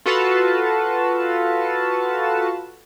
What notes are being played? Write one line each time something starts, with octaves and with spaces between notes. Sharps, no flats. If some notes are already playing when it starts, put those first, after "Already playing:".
F4 F#4 A4 B4 F5 A5